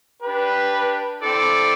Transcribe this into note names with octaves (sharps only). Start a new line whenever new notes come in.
D4 G4 B4
C4 E4 A4 D5